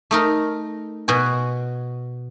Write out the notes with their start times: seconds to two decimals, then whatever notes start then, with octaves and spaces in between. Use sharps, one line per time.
0.11 A3 D#4 A#4
1.08 B2 F#4 G#5